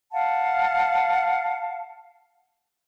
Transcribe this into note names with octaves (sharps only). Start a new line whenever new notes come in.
F5 F#5 A5